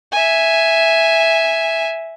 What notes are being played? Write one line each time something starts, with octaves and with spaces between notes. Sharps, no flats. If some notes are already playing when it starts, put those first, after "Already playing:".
E5 G#5